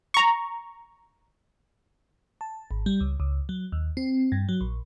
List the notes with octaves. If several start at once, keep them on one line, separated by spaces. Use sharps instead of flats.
A#5 C#6
A5
G#1
G3
C#2
C#2
F#3
D#2
C4
G2
F#3
A#1